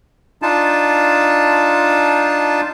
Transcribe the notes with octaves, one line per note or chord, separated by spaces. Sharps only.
D4 D#4 F4 A5